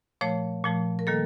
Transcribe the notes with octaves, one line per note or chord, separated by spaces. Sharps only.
A#2 F3 A3 C#5
A#2 F3 A3
A#4
D#3 G3 A#3 A4